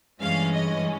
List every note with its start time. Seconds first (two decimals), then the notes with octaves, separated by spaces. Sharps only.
0.21 G2 E3 G#3 C#4 F5
0.52 D#5